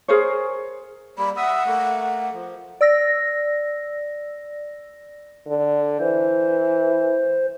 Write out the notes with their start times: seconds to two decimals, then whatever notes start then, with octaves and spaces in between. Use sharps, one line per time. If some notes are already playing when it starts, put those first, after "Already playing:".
0.08 G#4 A#4 C5 C#5
1.18 G3 A#3 B5
1.37 E5 F#5 D#6 E6
1.66 A3 A#3
2.33 F3
2.81 D5 E6 A#6
5.47 D3
6.00 E3 C5